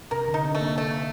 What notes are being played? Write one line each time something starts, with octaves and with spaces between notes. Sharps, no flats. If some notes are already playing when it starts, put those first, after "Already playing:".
C3 A#4
D3
D#4
C4
A3
A#3
A3